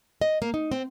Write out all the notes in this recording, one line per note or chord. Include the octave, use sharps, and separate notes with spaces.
D#5
A#3
D#4
C4